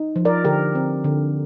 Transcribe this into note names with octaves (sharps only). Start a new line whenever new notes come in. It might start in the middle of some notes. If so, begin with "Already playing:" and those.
Already playing: D#4
F3
A#4 D5
D3 G4 A#4
C4
D3